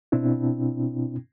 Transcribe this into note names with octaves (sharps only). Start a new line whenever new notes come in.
B2 C4 D4 E4